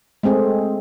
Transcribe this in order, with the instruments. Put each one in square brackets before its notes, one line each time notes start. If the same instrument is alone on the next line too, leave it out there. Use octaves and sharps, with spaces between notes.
[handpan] G#3 A3 C4 G#4